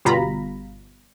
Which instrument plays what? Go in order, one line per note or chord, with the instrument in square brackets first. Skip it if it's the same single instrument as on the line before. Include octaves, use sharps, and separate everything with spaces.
[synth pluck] G1 B2 G3 F4 A#5 B5